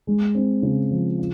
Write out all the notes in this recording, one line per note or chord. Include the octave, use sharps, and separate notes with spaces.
G#3
C4
C#3
F3
F4